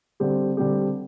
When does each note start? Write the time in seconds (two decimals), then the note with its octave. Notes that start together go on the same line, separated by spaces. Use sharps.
0.20 D3 G3 C4 G4
0.57 D3 G3 C4 G4